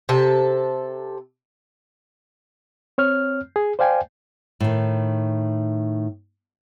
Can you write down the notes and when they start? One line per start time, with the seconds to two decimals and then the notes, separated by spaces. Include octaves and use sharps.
0.09 C3 A4
2.98 C4 C#5 F6
3.56 G#4
3.79 C5 D5 F5 G5 G#5
4.60 A2 D#3